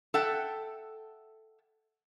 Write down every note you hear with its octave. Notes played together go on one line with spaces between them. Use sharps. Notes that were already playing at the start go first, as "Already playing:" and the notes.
A4 E5 F#5 G5